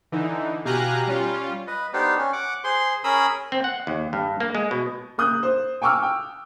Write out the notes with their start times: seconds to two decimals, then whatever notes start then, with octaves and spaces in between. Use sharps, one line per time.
0.12 D3 E3 D#4
0.65 B2 G4 F5 G#5 A#5 F#6
1.07 G3 C#4 F4
1.67 B4 D#5
1.93 B3 D4 D#4 G4 A4 C5
2.18 C#4
2.33 F#5 D6
2.64 G#4 C5 C6
3.04 C#4 G#4 A#4 B5 D#6 E6
3.52 C4
3.64 F#5
3.87 D#2
4.13 G2
4.40 A#3
4.55 G#3
4.71 B2
5.18 A#3 D#6 F#6 G6
5.43 C5
5.82 G5 G#5 C#6 D6 E6 F6
6.03 G5